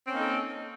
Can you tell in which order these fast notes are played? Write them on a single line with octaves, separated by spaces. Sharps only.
C4 C#4 A#3 D#4 A4